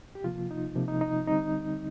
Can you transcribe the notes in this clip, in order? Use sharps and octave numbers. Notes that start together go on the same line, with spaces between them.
G4
C3 F3 A#3 F4
D#4
C3 F3 A#3
D#4
D#4
D3 G3 C4 D#4